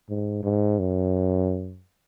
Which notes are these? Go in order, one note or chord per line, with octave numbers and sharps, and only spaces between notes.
G#2
G#2
F#2